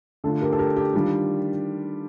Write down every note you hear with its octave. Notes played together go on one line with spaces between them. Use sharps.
D3 A3 D4 F4 A4
G4 A#4
A4
G4 A#4
G4
D#3 G3 D4 F4 G4